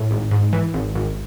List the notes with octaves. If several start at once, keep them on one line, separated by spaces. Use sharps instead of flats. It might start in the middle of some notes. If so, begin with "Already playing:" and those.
Already playing: A2
G#1
G#2
E3
G#1
G#1